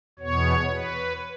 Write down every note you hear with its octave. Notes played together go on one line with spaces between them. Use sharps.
E2 B2 B3 C#5
B4